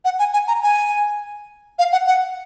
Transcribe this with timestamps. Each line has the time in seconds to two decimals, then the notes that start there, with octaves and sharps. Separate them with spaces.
0.05 F#5
0.19 G#5
0.33 G#5
0.48 A#5
0.62 G#5
1.79 F5
1.92 F#5
2.07 F#5